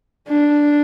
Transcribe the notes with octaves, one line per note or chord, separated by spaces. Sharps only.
D4